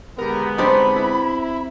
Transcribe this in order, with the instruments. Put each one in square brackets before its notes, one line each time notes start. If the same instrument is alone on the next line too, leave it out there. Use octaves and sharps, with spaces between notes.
[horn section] D3 G#3 B3 [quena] G4 [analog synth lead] A#4
[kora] C4 D4 G4 [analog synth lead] D#4 [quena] B5
[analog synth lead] E4